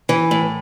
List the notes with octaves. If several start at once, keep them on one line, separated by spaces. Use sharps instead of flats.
E3
A2